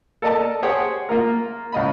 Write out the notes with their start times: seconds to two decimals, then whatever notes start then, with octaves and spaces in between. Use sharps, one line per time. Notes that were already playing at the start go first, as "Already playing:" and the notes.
0.22 A4 A#4 D5 D#5 A5
0.62 G4 G#4 C5 C#5 F#5 G5
1.09 A#3 F4 A#4
1.72 C#2 D#5 B5